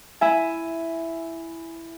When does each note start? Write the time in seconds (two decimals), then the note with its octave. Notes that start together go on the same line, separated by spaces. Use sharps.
0.21 E4 E5 G#5